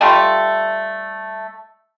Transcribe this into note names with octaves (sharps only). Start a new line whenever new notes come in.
G3 A3 F4 G4